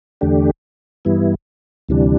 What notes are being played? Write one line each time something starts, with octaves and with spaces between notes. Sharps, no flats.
E2 D3 A3 D4 G4
G2 E3 G3 B3 E4
D2 C3 E3 G3 D4